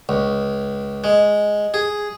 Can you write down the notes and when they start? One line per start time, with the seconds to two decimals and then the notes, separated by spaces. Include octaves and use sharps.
0.09 C#2
1.04 G#3
1.74 G#4